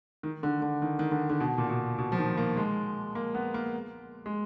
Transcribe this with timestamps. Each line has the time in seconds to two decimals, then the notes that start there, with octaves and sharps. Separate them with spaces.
0.23 D#3
0.43 D3
0.62 D3
0.82 D#3
0.99 D#3
1.11 D3
1.30 D3
1.40 B2
1.58 A#2
1.70 B2
1.98 B2
2.12 F3
2.18 D#3
2.37 A#3
2.57 G#3
3.15 A#3
3.35 B3
3.54 A#3
4.26 G#3